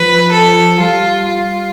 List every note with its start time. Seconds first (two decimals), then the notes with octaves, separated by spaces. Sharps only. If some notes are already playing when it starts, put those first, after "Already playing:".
Already playing: F3 B4
0.32 A4
0.79 G3 F4
1.28 F4